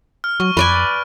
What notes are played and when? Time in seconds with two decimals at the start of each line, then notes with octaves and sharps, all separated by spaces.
0.24 F6
0.40 F#3 C#6
0.57 F2 B4 D5 G#5